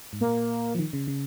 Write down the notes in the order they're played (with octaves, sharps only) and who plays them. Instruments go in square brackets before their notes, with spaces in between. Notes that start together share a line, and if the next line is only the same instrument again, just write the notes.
[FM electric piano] G#2
[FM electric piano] A#2 [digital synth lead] A#3
[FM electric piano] F3
D#3
C#3
C#3